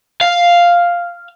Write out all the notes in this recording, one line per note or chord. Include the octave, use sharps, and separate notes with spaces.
F5